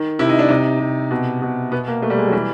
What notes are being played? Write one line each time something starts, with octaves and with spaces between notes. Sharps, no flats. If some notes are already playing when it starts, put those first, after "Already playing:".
Already playing: D#3
C3 E4
D#4
D4
C3 D#4
C3
B2
B2
B2 B3
A#3
B2 A3
G3
G#3
F#3
E3 G3